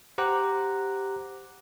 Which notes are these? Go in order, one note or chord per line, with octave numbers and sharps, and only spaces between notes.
G4 C5 F#5 A#5 D6 F#6